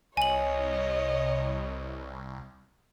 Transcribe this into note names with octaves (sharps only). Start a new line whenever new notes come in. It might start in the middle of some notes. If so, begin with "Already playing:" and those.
C2 C#5 D#5 G#5 F#7